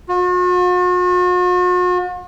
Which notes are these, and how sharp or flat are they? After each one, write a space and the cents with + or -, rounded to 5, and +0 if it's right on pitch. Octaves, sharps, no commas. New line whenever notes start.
F#4 -45